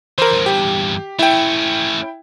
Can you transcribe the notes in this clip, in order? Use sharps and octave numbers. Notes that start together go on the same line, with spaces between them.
E3 A#4 C5
E2 G2
G4
A3 C#4 E4 G5